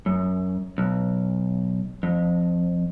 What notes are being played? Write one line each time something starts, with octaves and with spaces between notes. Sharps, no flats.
F#2
B1
F2